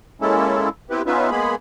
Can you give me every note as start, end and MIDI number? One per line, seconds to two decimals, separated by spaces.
0.21 0.69 56
0.21 0.69 58
0.21 0.69 61
0.21 0.69 64
0.21 0.69 69
0.90 1.02 59
0.90 1.02 60
0.90 1.02 64
0.90 1.02 67
0.90 1.02 71
1.06 1.30 59
1.06 1.30 61
1.06 1.30 63
1.06 1.30 65
1.06 1.30 71
1.06 1.30 76
1.31 1.55 56
1.31 1.55 58
1.31 1.55 59
1.31 1.55 68
1.31 1.55 83